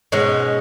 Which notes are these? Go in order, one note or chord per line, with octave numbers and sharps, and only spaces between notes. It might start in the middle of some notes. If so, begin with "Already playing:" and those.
G#2 B2 G#3 C#4